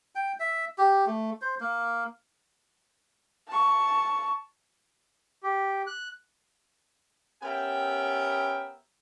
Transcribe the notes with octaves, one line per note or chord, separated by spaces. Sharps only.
G5
E5
G4
A3
C5
A#3
A5 C#6
G4
F#6
B3 C#4 G4 A#4 E5 G5